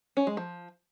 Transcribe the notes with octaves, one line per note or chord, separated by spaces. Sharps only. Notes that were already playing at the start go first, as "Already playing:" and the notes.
C#4
G#3
F3